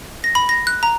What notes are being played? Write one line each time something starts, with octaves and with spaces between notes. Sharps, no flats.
A#6
B5
A#6
F#6
A#5